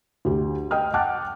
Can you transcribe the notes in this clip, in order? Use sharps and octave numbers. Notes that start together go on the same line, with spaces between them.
D2 G4
D#5 G5 D#6 F6
F#5 G5 A5 D6 F6 F#6